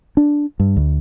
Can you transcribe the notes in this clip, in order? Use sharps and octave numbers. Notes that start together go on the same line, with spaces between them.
D4
G2
D2